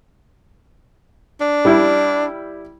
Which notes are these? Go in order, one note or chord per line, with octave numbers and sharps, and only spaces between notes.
D4
G3 E4